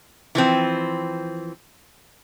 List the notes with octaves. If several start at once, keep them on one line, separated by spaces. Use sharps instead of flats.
E3 F3 C4